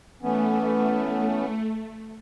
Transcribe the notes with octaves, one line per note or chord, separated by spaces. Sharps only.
E3 A3 B3 C#4